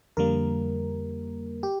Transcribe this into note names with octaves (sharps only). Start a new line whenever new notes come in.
F2 D3 G3 A#3 A#4
G4